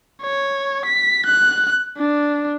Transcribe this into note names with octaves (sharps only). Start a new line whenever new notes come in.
C#5
B6
F#6
D4